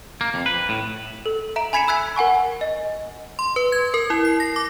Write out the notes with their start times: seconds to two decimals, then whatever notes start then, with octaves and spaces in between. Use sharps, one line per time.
0.21 A#3
0.34 F2
0.46 B4
0.69 A2
1.26 A4
1.56 E5 A#5 D7
1.73 G#5 B5 G#6 B6 C#7 E7
1.88 B5 E6 F#6 G#6 B6
2.16 A#4 F#5 G#5 C#6
2.61 D#5
3.39 C6
3.56 B4
3.72 G#6
3.94 A#4
4.10 E4
4.25 C7
4.40 A#6
4.56 D6